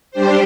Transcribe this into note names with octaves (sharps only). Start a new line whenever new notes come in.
G3 D4 G4 C5